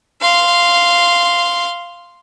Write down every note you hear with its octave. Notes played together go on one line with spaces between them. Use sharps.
F5 C6